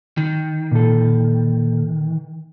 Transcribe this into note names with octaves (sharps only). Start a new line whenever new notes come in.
D#3
A#2 A4